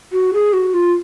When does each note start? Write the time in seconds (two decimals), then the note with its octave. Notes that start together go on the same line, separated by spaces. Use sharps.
0.12 F#4
0.34 G#4
0.53 F#4
0.74 F4